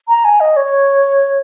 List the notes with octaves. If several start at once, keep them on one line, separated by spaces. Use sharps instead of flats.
A#5
G#5
D#5
C#5